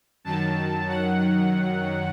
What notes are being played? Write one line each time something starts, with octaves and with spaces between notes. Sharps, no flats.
F#2 D#3 F#3 A5
F#5